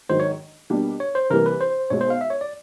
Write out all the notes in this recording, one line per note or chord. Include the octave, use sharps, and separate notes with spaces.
G#2 D#3 F#3 C5
C#5
B2 G3 A#3 D4 G4
C#5
C5
C2 C3 E3 G3 A#3 A#4
B4
C5
B1 B2 G#3 C#5
C5
F5
E5
C#5
D5